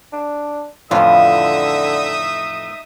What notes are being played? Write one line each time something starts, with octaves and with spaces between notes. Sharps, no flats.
D4
F2 A2 D3 E3 D#4 F4 E5 D#6